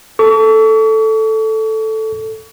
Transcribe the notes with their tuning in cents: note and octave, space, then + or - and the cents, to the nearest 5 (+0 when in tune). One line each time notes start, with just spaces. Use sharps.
A4 +0 C#6 +40